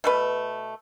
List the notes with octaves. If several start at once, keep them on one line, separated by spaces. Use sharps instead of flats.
B2 A3 B4